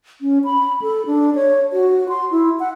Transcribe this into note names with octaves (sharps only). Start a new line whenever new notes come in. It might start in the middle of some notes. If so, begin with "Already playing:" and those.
C#4
B5
A4
D4
C#5
F#4
C6
E4
F#5